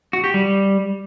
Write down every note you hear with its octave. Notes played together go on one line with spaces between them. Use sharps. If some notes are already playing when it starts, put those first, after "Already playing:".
F#4
G4
G3